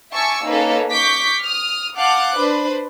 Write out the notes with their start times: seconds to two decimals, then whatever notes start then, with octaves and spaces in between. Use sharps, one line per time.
0.13 E5 G#5 A5 C#6 D6 E6
0.45 A#3 C#4 D#4 A4 B4
0.90 C#6 D6 G6 B6
1.41 D#6 F6
1.96 F5 F#5 A5 D6 F#6 G6
2.36 D4 B4 C5